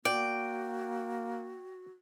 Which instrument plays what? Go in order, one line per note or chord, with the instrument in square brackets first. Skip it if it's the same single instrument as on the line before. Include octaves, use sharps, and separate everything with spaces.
[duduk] A#3 [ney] F#4 [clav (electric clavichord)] D5 [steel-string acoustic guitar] G5